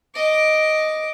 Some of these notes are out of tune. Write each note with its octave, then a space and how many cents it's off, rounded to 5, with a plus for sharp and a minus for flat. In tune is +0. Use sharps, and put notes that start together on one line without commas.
D#5 +0 D6 +0